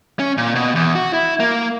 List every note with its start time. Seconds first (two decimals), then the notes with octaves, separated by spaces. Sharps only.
0.19 C#4
0.38 A#2
0.55 B2
0.75 E2
0.95 F#4
1.13 E4
1.40 A#3